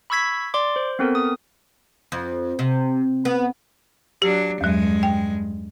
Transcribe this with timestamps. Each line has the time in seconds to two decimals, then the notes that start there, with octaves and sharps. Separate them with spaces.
0.10 B5 C#6 E6 G#6 B6
0.54 D5 C6 D6
0.76 C5
0.99 B3 C4 A4 A#4
1.15 D#6
2.12 F2
2.59 C3
3.25 B3
4.22 F#3 D4 G4
4.61 E2 G2 F#3 G#3
5.03 G5